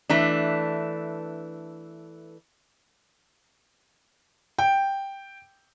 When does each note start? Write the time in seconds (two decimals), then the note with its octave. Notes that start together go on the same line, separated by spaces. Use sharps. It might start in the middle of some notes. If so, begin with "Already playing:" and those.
0.10 E3 A3 D4
4.59 G5